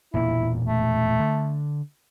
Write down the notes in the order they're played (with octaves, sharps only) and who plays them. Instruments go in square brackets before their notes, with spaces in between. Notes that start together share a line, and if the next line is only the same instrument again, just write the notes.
[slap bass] E1 A#2 A#3 [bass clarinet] E4
[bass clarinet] A3
[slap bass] D3